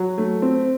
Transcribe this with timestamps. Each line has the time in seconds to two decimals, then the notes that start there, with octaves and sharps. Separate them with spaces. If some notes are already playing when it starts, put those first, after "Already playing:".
Already playing: F#3
0.18 A3
0.42 C4